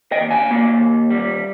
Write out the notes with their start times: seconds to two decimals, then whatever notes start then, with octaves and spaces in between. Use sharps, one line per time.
0.12 D#5 G5
0.21 D#2
0.31 F5 G#5
0.51 A#3
0.80 D#2
1.10 G3